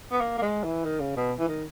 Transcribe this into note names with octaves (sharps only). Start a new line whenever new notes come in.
B3
A#3
A#3
G#3
E3
D#3
C#3
B2
E3
D#3